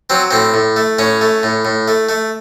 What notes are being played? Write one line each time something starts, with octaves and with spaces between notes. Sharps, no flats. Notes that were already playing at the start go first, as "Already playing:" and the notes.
F#3 C4
A2 C4
A2
A3
A2 C#4
A3
A2
A2
A3
A3